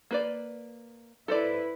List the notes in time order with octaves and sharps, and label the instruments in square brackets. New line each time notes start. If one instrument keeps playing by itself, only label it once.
[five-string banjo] A#3 B4 D5
[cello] E4 B4 [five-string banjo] A4 C5 D5